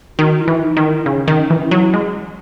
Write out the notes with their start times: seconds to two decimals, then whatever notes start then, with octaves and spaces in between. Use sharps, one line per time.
0.18 D#3 F#4
0.41 E4
0.48 E3
0.63 D#4
0.77 D#3
0.84 E4
1.06 C#3 C#4
1.28 D#3
1.35 C#4
1.50 E3
1.65 E4
1.71 F#3
1.94 G#3